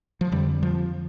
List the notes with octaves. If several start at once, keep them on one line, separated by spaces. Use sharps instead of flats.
F3
F2 D3 G3
F3